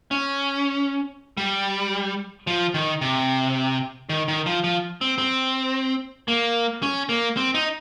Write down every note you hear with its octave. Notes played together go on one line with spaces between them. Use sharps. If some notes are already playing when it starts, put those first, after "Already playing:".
C#4
G3
F3
D#3
C3
D#3
D#3
F3
F3
C4
C4
A#3
C#4
A#3
C4
D#4